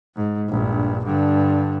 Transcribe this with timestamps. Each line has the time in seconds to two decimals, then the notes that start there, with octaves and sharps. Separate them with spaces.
0.16 G#2
0.48 A#1 G2
1.05 G2 D3